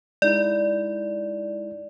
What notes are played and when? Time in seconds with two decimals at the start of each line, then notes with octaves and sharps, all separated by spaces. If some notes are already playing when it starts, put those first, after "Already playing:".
0.22 G#3 D#4 E4 D5